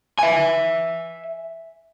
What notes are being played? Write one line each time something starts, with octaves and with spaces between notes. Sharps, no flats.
E5 G#5